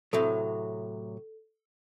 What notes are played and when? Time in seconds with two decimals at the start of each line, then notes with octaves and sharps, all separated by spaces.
0.13 A2 C3 F#3 A4